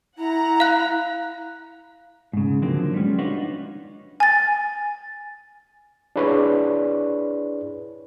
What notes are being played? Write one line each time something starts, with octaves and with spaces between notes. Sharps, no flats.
E4 F#5 A#5
F5 F#6
G#2 C#3
D3 D#3 F3 F#3 A#3 C4
G3 G#3 B3 C#4
D4 D#4 F4 F#4 B4 C#5
G#5 A6
D4 E4 G#4 B4 C#5 D5